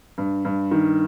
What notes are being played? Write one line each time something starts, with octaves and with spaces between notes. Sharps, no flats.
G2
G2
D#3